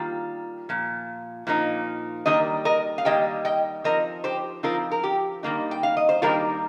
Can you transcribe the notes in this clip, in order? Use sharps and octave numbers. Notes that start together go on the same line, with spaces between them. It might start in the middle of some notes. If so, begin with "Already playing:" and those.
Already playing: D#3 G3 A#3 F4
A#2 F3
A#2 F3 A#3 D#4
D#3 G3 A#3 A#4 D#5
A#4 D#5
F5
D#3 G3 A#3 D#5 G5
D#5 G5
F3 C4 D#4 A#4 D#5
G4 C5
F3 C4 D#4 F4 A#4
A#4
G4
D#3 G3 A#3 D#4
G5
F5
D#5
C5
D#3 G3 A#3 D#4 F4 A#4